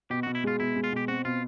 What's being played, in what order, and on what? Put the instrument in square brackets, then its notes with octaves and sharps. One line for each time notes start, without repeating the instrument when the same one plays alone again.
[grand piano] B2 [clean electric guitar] G4
[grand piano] B2 [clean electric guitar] F#4
[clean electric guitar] E4
[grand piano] G#3 [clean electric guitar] F4
[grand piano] B2 [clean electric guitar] E4
[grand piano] G#3
[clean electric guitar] F4
[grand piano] B2 [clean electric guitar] G4
[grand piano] C4 [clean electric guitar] F#4
[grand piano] B2 [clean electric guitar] F4